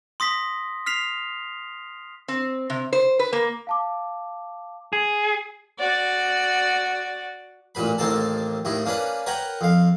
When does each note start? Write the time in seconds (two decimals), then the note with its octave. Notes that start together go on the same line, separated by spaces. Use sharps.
0.20 C6 D#6 A#6 B6
0.86 F6 B6 C7 F7
2.28 C4
2.70 C3
2.93 C5
3.19 B4
3.33 A#3
3.67 F5 A5 D6
4.93 G#4
5.78 F#4 D5
7.75 A1 A#2 B4 B5
7.98 A1 D#2 A#3 C4 A4 A5
8.65 D#2 A2 E4
8.86 A#3 C#4 D4 B4
9.26 A#4 B4 C#5 F#5 G5
9.61 F2 F5